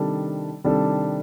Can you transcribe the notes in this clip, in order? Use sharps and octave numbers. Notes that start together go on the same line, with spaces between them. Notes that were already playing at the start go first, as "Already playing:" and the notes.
Already playing: C3 D#3 G3 D4 A4
C3 D#3 G3 D4 A4